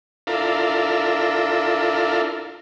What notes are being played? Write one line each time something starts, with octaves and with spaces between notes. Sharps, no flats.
D4 E4 F4 A4 A#4